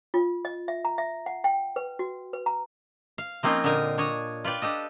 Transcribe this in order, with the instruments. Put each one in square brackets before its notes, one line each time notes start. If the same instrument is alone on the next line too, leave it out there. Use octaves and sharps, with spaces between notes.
[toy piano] F4
D#5
E5
A#5
E5
F#5
G5
B4
F#4
B4
A#5
[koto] F5
F3 A#3 C4 C#4 D#4 F4
A#2 D3 D#4 A#4
D4 C#5 D#5
F4 B4 D5 G5
D4 G4 A4 D#5